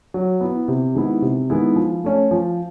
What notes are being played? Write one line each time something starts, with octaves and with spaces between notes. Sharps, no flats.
F#3
B3 E4
C3
D#3 G#3 B3 E4
C3
D#3 G#3 B3 E4
F3
A3 C#4
F3